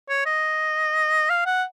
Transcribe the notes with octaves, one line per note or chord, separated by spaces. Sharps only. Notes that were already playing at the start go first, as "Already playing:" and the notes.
C#5
D#5
F5
F#5